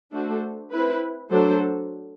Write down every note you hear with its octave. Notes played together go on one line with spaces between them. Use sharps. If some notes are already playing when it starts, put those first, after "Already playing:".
A3 D4 F#4 A4 C5
C4 E4 B4
F#3 A3 D4 A4 C5